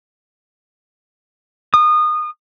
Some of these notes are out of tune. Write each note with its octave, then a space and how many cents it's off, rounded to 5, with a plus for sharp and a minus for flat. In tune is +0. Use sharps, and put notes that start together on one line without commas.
D#6 -25